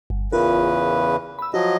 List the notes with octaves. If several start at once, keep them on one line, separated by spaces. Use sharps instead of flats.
G1
E2 C#3 F4 A#4 B4
B5 E6
F3 F#3 F#4 D#5